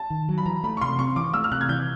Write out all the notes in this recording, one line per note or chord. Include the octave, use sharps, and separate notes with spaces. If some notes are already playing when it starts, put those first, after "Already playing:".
Already playing: A5
D#3
F#3
B5
E3 A#5
A3 B5
C#6
C3 C6
C4 C#6
E3 D6
A3 E6
F6
C3 F#6
G#6
E3 G6